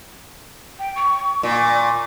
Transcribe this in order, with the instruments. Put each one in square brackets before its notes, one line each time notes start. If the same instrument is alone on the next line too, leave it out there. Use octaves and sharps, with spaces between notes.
[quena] G5
C#6
[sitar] A#2 [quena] C#6